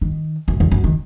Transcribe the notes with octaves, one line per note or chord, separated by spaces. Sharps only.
D#3
F#2
E2
F#2
D#3